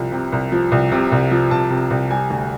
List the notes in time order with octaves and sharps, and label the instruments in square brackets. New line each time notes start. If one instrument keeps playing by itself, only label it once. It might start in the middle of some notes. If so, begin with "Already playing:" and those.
Already playing: [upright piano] C2 F3
C3
C2
F3
C2
C3
C2
F3
C2 A5
C3
C2
G3 G#5
D2